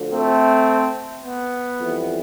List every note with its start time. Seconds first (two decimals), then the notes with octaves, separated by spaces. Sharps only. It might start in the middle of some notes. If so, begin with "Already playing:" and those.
Already playing: D2 D3 F3
0.12 A3 C4
1.23 B3
1.79 F2 E3 G3